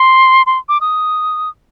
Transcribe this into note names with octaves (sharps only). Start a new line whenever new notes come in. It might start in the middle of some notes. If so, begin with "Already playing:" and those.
Already playing: C6
C6
D6
D#6